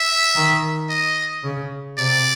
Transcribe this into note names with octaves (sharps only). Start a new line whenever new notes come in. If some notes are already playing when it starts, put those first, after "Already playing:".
Already playing: E5
D#3
D#5
C#3
C3 D5